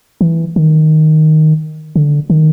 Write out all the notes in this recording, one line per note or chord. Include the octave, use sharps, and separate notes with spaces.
E3
D#3
D3
D#3